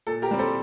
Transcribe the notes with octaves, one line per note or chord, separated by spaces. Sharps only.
A#2 A4
G4 A#4
G3 C4
A4 C5